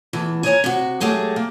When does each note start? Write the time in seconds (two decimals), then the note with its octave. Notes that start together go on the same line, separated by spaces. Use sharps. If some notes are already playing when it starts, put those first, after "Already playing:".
0.13 E2 E3 A3
0.43 A#4 C#5 D#5 G#5
0.64 C3 F#4
1.00 F#3 G#3 A3 G4 G#4
1.36 A#3